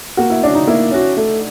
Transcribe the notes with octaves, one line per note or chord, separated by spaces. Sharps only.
A#3 F#4
E4
C#4 D4 F#4
D#4
A#3 E4
C#4 F#4
A3